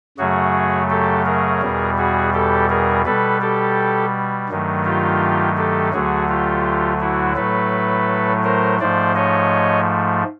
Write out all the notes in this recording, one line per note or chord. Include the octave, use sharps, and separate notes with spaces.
F#2 C#3 F#3 A3 F#4 G#4
G4 A4
G#4 A#4
E2 B2 G3
F#4 G#4
G4 A4
G#4 A#4
B2 G3 A4 B4
G4 A4
G2 D#3 F#3 A3
F4 G4
G4 A4
D2 D3 F#3 A3 F#4 G#4
F4 G4
E4 F#4
A2 F#3 A3 A4 B4
A#4 C5
G#2 F3 A3 C5 D5
C#5 D#5